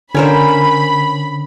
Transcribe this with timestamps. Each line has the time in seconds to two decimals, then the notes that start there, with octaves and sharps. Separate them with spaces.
0.15 D3 C#4 A#4 C5 B5